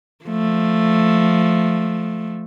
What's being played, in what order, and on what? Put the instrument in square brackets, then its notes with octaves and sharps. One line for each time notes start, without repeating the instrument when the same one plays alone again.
[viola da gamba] F3 A3